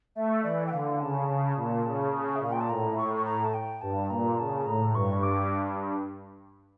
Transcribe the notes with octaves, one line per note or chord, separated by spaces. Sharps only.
A3 E5
E3 D5
G5
D3 F5
C#3 A5
C#3
A#2
C#3
C#3
E5
A#2 F5
G5
A5
A2 A#5
C#6
C#6
A#5
A5
G5
G2 A5
A#2 A#5
C#3 A5
A2 A#5
G2 C#6
D6